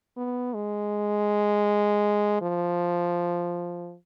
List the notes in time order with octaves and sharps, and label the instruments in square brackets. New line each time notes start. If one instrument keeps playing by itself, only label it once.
[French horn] B3
G#3
F3